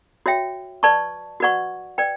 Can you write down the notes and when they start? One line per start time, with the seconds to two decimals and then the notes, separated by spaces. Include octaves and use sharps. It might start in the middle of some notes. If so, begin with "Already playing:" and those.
0.26 F#4 C#5 E5 G5
0.83 B4 D5 A5 C#6
1.40 F#4 B4 D5 F#5 C#6
1.98 B4 D5 G5